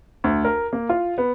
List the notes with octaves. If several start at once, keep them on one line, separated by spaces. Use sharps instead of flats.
D2
A#4
A#3
F4
B3